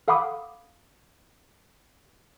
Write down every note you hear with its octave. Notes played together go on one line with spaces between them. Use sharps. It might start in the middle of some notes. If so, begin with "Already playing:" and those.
A4 F5 F#5 B5 D6 D#6